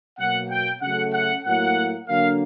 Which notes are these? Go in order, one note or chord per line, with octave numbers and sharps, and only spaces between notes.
B2 F#3 A#3 F#5
G5
C#3 F#3 A3 F#5
F#5
A2 F#3 A#3 F#5
D3 F#3 A#3 F5